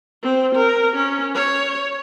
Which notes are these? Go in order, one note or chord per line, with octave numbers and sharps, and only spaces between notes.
C4
A#4
C#4
C#5